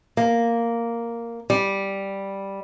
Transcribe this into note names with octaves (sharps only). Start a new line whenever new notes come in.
A#3
G3